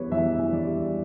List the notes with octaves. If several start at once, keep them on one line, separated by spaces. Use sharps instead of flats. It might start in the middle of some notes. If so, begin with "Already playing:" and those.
Already playing: E3 G3 B3 B4 C#5
E3 E5
E3
D5
G3